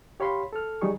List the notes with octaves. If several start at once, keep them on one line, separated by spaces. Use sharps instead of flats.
G4 C#5 F5 B5 C6
A4 F6
D#3 F#3 G3 D#4 G#4 C#6